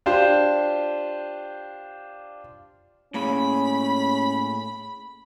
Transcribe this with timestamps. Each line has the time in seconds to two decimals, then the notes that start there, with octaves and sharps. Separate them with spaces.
0.06 D4 F4 G4 C5
3.14 A2 A#3 C#4 G#4 B5